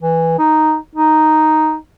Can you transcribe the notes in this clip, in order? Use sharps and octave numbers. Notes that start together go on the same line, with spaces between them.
E3
D#4
D#4